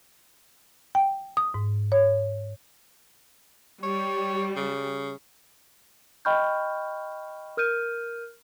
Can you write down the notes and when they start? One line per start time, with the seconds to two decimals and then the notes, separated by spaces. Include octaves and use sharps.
0.95 G5
1.37 D#6
1.54 G#2
1.92 C#5
3.83 G3 C#5
4.56 C#3
6.25 D#5 G5 B5 C#6 F6 G6
7.57 A#4 F6 G6 D#7